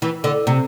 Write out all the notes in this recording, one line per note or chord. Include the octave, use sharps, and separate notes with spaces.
E3
D3
C3